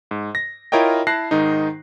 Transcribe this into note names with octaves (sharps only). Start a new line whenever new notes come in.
G#2
A#6
E4 F4 A#4 C#5 D#5 G5
E4 A5 F#6 A#6 C7
G#2 D#3 D#4